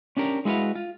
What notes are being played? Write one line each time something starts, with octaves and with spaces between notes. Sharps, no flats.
C#4 D4 G4 A#4
G#3 E4 F#4 B4 F5
F4